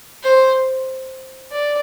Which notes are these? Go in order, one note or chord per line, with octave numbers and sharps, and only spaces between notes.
C5
D5